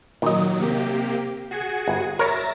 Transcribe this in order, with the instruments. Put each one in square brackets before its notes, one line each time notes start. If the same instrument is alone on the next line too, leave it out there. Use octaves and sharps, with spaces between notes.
[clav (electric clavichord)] A#2 D#5 [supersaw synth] D#3 F#3
[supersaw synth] C3 A#3 G4
F#4 G#4 G#6
[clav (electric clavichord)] G1
[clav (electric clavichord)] A#4 C#5 [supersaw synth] E5 A6 A#6